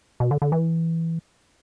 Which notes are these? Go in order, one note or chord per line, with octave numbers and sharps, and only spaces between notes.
B2
D3
D3
E3